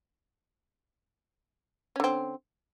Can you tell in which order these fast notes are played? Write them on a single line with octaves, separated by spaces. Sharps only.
C#4 D3 C4